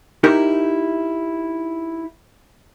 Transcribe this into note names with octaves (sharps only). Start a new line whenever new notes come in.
D#4 E4 G4 A#4 E5